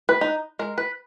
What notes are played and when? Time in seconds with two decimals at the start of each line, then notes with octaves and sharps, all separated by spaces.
0.09 B4
0.21 D#4
0.59 G#3 A#4
0.78 B4